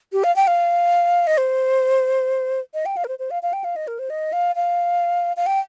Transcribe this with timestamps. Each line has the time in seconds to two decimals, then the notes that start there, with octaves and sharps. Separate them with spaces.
0.12 G4
0.24 F5
0.36 G5
0.47 F5
1.27 D#5
1.37 C5
2.74 D#5
2.86 G5
2.97 F5
3.04 A#4
3.08 C5
3.19 C5
3.31 F5
3.43 F5
3.53 G5
3.64 F5
3.76 D#5
3.87 A#4
3.99 C5
4.10 D#5
4.33 F5
4.55 F5
5.36 F5
5.46 G5